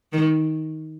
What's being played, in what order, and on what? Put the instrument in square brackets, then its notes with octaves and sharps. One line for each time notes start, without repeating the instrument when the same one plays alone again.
[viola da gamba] D#3